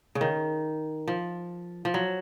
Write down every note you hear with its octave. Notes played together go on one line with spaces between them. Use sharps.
C#3
D#3
F3
F3
F#3